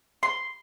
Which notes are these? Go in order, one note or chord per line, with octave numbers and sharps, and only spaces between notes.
C6